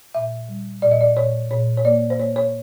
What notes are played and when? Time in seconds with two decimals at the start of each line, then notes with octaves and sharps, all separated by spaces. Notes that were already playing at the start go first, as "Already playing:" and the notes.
0.15 A#2 E5
0.49 G3
0.82 A#2 D5
0.91 D#5
1.01 D5
1.16 A#2 C#5
1.51 A#2 C#5
1.77 C#5
1.85 A#3 D5
2.10 C5
2.19 A#3 C#5
2.36 C#5